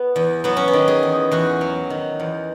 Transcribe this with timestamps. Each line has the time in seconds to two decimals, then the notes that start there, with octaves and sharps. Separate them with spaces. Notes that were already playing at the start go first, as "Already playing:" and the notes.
Already playing: B3
0.16 E2
0.44 F#3 B3
0.57 C#4
0.68 B3
0.73 D#3
0.88 G#4
1.03 E2
1.31 E2 F#4
1.61 F#3
1.90 D#3
2.20 E2